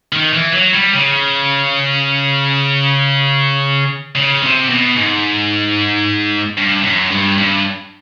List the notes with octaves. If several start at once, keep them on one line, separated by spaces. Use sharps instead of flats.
D#3
E3
F#3
G3
C#3
C#3
C3
B2
G#2
G2
F#2
G2
G2